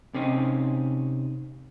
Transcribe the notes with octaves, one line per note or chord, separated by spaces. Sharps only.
C3 C4 C#4 D#4